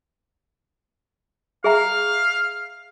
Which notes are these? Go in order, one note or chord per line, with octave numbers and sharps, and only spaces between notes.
G#4 E5 F5 A#5